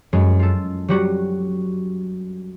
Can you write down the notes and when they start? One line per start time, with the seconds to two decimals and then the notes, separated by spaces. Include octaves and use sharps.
0.13 F#2 F#3 G#3
0.40 F4 A4
0.88 F#3 G3 F#4